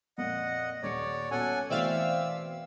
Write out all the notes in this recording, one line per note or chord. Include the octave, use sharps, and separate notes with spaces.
F2 A#2 D#5 F#5
D#1 C#5 D5 C#7
B2 C#4 A4 F#5 G#5
B2 E3 A3 C4 D5 E5 F5 E6